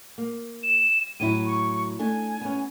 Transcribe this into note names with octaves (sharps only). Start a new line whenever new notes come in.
A#3
E7
A2 F#3 E4 D#7
C#6
A3 D4 G#5
B3 C#4